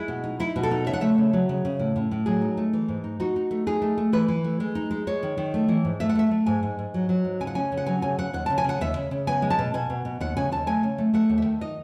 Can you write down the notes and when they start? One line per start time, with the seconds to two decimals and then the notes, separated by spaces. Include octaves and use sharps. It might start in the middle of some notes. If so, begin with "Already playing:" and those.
Already playing: G#3 E4
0.08 B2
0.24 D#4
0.40 D#4 E4
0.56 B2
0.63 A4
0.71 D#4
0.86 C#3 E5
0.93 F#5
1.01 A3 E5
1.18 C#3
1.33 F#3
1.49 C#3
1.65 C#3
1.79 A2
1.96 A2
2.11 A2
2.26 F#3 G#4
2.42 D#4
2.57 A3
2.73 E3
2.88 G#2
3.04 D#4
3.20 D#4 F#4
3.36 D#4
3.51 A3
3.67 D#4 G#4
3.82 A3
3.98 A3
4.13 E3 B4
4.28 E3
4.44 A3
4.60 G#3
4.75 D#4
4.91 G#3
5.07 G#3 C#5
5.23 D#3
5.37 D#3
5.54 A3
5.68 E3
5.85 G#2
6.00 A3 E5
6.09 F#5
6.15 A3 E5
6.31 A3
6.46 G#2 G#5
6.63 G#2
6.79 G#2
6.94 F#3
7.09 F#3
7.25 G#2
7.40 C#3 G#5
7.47 F#5
7.55 C#4 G#5
7.72 C#3
7.77 F#5
7.86 F#3 G#5
8.02 C#3 G#5
8.19 C#3 F#5
8.33 D#2 F#5
8.46 C#3 A5
8.58 G#5
8.64 C#3 F#5
8.81 D#2 E5
8.96 C#3
9.11 C#3
9.27 B3 G#5
9.42 G#3
9.50 A5
9.59 B2
9.74 B2 G#5
9.90 B2
10.05 B2
10.20 D#2 F#5
10.37 C#3 G#5
10.52 D#2 A5
10.67 A3 G#5
10.83 C#3
10.98 A3
11.13 A3 F#5
11.29 D#2
11.38 E5
11.45 D#3
11.61 D#4 D#5